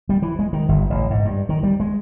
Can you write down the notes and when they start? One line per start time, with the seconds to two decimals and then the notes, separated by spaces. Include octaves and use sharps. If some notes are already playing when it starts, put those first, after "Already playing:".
0.09 G3
0.22 E3
0.39 G#3
0.53 D#3
0.69 G1
0.90 A1
1.10 G#2
1.25 G2
1.49 D#3
1.63 G3
1.80 G#3